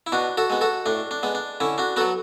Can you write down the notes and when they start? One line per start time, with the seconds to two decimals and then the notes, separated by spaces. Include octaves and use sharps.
0.07 E4
0.12 B2 D4 F#4
0.37 F#4 A4
0.50 G#3 B3
0.61 F#4 A4
0.86 A2 D4
1.11 D4
1.23 G#3 B3
1.35 D4
1.60 D3 C#4 E4
1.78 D4 F#4
1.96 F#3 B3 F#4 A4